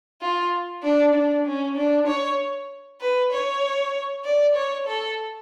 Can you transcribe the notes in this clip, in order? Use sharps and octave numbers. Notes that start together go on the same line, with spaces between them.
F4
D4
D4
C#4
D4
C#5
B4
C#5
D5
C#5
A4